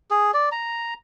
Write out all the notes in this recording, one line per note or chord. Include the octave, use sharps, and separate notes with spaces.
G#4
D5
A#5